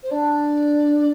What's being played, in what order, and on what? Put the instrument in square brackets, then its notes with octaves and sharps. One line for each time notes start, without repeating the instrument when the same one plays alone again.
[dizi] C5
[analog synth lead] D4 [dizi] D5